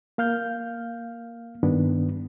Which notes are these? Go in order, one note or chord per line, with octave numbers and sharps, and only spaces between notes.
A#3 F5 F6 G6
G2 D#3 B3 D4